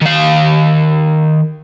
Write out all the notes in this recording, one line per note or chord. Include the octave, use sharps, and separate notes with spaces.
D#3 F5